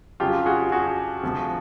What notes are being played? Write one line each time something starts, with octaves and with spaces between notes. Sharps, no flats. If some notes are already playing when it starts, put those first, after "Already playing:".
F2 C#3 F#3 F4 G4
F#4 G#4
F#4 G#4
D2 C3 F3